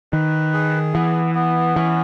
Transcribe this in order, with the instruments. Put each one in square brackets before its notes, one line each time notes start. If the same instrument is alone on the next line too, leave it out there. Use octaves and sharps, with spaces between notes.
[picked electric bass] D#3 [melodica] B4
[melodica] G#4
[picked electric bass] E3 [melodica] B3
[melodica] B3
[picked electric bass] E3 [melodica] C#4